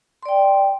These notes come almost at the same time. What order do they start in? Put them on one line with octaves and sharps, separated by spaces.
C6 D5 G5